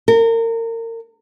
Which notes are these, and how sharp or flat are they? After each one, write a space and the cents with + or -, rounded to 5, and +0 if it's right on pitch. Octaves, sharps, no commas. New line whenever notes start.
A#4 -30